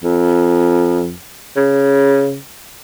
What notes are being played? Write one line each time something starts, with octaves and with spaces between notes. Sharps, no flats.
F2
C#3